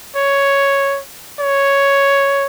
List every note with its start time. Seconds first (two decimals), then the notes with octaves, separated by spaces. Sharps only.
0.16 C#5
1.40 C#5